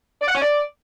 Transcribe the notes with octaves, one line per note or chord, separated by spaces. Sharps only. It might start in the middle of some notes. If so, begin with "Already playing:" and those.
D5
F#5
C#4
D5